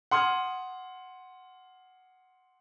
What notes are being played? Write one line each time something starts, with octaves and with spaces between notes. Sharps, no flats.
F#5 C6 D#6 F6 G#6